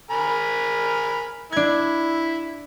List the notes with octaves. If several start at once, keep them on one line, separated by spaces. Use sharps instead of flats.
A#4 G#5 B5
D4 E4 G#6